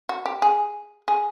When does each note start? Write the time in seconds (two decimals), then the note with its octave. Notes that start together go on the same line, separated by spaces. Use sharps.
0.09 F#4
0.26 G4
0.42 G#4
1.08 G#4